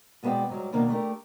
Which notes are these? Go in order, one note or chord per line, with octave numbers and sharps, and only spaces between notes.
B2 G#3 B3 B4 D5 G5
G#2 F#3 G3
B2 D#3 A#3 D4
A3 D4 G4 A#4